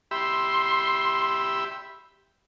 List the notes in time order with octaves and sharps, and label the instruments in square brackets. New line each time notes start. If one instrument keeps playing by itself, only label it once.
[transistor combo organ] G4 E5 B5 [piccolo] C6